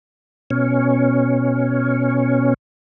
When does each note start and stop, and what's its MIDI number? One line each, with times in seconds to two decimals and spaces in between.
0.50 2.54 47
0.50 2.54 61